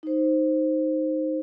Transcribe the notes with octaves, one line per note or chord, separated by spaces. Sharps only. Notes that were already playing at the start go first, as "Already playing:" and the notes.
D#4 C5